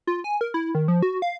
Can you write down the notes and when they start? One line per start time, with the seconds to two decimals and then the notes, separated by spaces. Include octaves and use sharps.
0.07 F4
0.24 G#5
0.41 A#4
0.54 E4
0.75 D#3
0.88 F3
1.02 F#4
1.22 F5